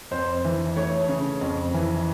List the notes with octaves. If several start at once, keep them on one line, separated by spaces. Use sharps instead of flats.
F2 C5
E3
A3 C#5
C#3
F2
E3